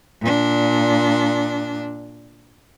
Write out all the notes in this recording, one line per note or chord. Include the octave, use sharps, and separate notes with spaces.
A#2 D4